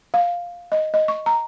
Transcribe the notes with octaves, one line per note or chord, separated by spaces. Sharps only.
F5
D#5
D#5
C#6
A#5